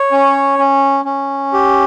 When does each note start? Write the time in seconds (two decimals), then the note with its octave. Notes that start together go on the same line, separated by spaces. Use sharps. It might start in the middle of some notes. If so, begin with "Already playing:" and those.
Already playing: C#5
0.12 C#4
0.59 C#4
1.05 C#4
1.53 G4